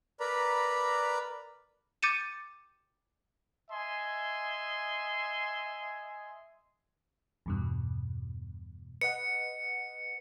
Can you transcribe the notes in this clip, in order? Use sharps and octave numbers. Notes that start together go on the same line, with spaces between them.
A#4 B4 D5 A#5 B5
D6 G6 A6 C#7 D#7 E7
D#5 E5 G#5 C6
E2 G2 B2
B4 D#5 F#5 C#7